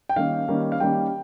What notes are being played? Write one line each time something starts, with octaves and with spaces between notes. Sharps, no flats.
G5
D#3 G3 A#3 C#4 F5
D#3 G3 A#3 C#4
F5
D#3 G3 A#3 C#4 G5